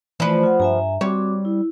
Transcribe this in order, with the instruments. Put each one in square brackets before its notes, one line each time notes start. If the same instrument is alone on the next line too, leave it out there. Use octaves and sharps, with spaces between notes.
[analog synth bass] E3 [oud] F3 B4 [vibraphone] A3 D5
[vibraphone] F4 F#5
[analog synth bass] G2 [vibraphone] E5 G#5 A#5
[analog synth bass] G3 [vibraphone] C4 F#4 D6 [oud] C#5
[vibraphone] E4